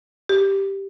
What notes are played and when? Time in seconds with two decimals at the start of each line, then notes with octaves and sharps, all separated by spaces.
0.29 G4